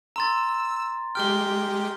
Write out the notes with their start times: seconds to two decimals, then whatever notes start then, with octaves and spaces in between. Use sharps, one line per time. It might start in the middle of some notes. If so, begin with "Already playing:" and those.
0.16 A#5 C6 E6 A6
1.15 G#3 G4 G5 F6 G7